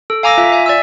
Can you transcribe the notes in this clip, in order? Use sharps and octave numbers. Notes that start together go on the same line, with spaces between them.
A4
F5 G#5 A#5 D6 E6 A#6
F4 E5
E5 G#5
D5 E5 E6